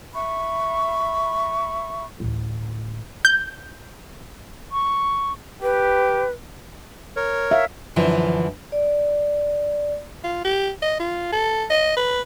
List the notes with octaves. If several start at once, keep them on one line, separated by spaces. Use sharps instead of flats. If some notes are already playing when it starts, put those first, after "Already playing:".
E5 B5 C#6
A1 D2
G6
C#6
G4 B4
A#4 C#5
E5 F5
F#2 D3 E3 F3
D5
F4
G4
D#5
F4
A4
D#5
B4